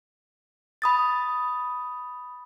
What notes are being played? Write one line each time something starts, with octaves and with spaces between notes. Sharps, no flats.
B5 D#6 A6